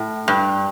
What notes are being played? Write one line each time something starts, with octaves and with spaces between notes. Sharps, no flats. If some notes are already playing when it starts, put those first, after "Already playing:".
Already playing: A2
G2